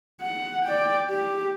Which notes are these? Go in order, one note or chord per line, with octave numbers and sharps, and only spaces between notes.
F#5
D5 G5
G4